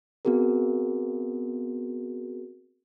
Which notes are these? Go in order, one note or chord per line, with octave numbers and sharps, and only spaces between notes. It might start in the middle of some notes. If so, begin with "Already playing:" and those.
B3 C4 F#4 G#4 A#4